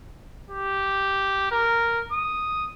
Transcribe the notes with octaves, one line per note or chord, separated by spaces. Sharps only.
G4
A#4
D#6